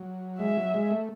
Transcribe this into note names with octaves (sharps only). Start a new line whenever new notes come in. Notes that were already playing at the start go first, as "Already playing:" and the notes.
Already playing: F#3
G#3 E5
F#3
G#3
A3